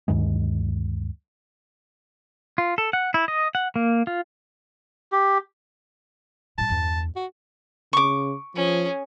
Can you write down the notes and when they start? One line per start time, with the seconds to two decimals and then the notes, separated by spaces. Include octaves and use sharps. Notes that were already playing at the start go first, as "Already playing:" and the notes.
0.08 D2 G2 D#3 G#3
2.58 F4
2.78 A4
2.93 F#5
3.14 E4
3.28 D#5
3.55 F#5
3.76 A#3
4.07 F4
5.12 G4
6.58 A2 G3 A5
6.69 E2 G2
7.16 F#4
7.93 C#3 C#6 D6
8.56 F3 C#4 G#4